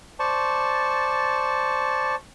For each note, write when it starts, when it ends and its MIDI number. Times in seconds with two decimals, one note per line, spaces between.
0.19 2.15 72
0.19 2.15 74
0.19 2.15 81
0.19 2.15 85